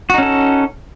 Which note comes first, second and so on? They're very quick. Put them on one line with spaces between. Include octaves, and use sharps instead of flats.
F#4 D#4 C#4 A4